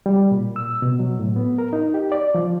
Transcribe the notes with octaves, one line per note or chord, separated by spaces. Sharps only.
G3
A#2
E6
B2
F#3
A2
B3
A#4
D#4
G4
D5
F3